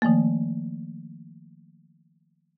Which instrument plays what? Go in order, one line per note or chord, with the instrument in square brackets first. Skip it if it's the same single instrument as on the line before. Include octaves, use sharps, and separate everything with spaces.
[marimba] D#3 F3 A3 A#3